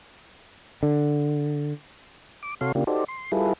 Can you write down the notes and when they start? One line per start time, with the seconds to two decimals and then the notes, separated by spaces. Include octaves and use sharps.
0.83 D3
2.43 D6
2.61 C3 F#4 A4 C#5 F5 C6
2.75 C#3 A#3 D4 F4 G4
2.87 D#4 F#4 G4 A4 C5 D5
3.08 C6
3.32 G3 E4 F4 G#4 A4 B4